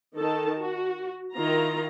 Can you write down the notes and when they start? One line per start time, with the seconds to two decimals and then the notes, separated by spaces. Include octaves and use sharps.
0.17 D#3 A4 A5
0.58 F#4
1.34 D#3 E4 F4 A#5